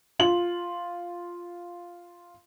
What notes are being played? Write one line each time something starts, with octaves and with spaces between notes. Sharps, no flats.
F4 F#7